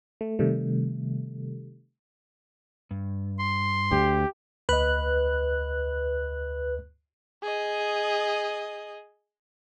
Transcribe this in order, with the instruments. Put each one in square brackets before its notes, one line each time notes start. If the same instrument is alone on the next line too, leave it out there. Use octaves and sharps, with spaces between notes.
[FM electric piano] A3
C3 D#3 G3 A3
[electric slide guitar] G2
[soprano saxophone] C6
[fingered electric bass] D2 [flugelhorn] G4
[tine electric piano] D2 D#5 [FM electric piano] B4 F#6
[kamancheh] G#4 D#5